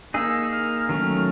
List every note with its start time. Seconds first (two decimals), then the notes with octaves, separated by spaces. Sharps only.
0.14 A#3 D#4 G#4 E6
0.52 F6
0.89 D#3 F#3 A3 C#4 F6